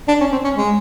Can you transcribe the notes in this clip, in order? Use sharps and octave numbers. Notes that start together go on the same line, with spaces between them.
D4
C#4
C4
C#4
G#3